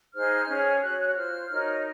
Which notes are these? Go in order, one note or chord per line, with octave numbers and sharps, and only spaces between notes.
D#4 G#4 C5 F6
C#4 G#4 C#5
F#4 C#5 F#6
F#6
F#6
F4 C5 F6
D#4 F#4 A#4 C#5